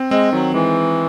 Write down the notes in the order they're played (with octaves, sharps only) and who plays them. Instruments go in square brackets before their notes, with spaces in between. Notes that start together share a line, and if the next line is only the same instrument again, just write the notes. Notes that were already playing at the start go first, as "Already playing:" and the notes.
Already playing: [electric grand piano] C4
[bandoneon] G#3 [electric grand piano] C4
[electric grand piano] D#3 [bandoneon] F#3
[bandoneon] E3 [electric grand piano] G#3